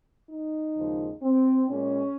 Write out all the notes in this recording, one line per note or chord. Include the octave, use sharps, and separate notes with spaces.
D#4
D#2 C#3 F3 G#3
C4
A#2 G#3 C#4